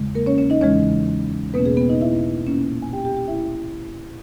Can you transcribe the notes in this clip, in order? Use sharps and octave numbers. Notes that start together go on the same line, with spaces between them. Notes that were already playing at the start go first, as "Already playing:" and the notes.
Already playing: E2 C#3 G#3
A#3 A#4
C#4 C#5
C#4 C#5
D#4 D#5
E2 C#3 E3 G#3 C#4 C#5
E2 B2 A#3 B3 C#4 B4
G#4
B3 B4
D#4 D#5
E4 E5
A#2 A#3 C#4
G#5
G4 G5
G4 G5
G4 G5
E4 E5